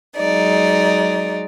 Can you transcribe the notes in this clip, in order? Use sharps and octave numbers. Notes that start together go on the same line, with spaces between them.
F#3 G#3 D#4 D5